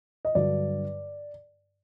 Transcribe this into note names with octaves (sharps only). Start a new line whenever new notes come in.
D#5
G2 D3 F#3 D5